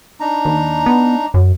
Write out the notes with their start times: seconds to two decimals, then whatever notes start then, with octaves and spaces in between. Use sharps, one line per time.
0.20 D4 D#4 A#5
0.45 D#2
0.86 B3
1.34 F#2